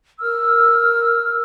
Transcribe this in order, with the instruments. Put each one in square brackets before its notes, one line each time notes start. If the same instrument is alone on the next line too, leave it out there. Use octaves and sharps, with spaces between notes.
[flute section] A#4 E6 F6